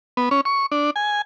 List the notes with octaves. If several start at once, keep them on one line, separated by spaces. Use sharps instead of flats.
B3
C#4
C#6
D4
G#5